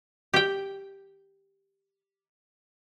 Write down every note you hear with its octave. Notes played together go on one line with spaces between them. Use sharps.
G4 G5